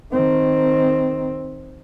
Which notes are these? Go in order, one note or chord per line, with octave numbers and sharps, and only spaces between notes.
D#3 C4